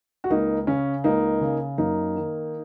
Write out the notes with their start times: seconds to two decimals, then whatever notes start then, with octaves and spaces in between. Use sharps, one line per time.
0.24 F#4
0.30 C#2 A#3 D#4
0.67 C#3 C#4
1.04 C#2 A#3 D#4
1.41 C#3
1.78 F#2 A#3 D#4
2.16 D#3